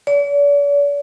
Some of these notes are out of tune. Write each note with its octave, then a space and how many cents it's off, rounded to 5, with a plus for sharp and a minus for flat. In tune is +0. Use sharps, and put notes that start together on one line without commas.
D5 -45